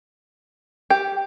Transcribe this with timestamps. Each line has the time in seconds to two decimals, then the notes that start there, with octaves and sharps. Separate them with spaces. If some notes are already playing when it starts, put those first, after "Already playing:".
0.90 G4